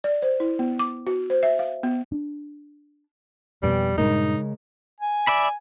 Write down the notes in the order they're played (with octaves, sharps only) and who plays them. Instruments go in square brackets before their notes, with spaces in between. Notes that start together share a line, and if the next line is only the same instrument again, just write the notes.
[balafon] D5
C5
E4
B3
D6
F#4
C5
E5
F5
B3
[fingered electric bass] D4
[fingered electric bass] F2 B2 [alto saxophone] G3 [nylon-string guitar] C#4 B4 G5
[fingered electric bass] G2 A#2 [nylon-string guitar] C#3 G#3 A#4 [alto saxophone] D#4
[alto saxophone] G#5
[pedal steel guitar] D5 E5 B5